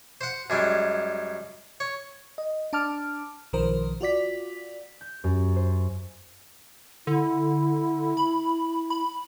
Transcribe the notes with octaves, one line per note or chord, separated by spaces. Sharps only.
C5 F#5
F#2 G3 G#3
C#5
D#5
D4 A5 D6 F6
B1 D#3 F3 A#4 C5
F4 F#4 D5 B6
G6
F#2
C5
D3 E4
B5
B5